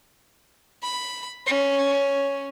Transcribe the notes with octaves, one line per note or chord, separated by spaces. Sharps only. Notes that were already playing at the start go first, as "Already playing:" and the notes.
B5
C#4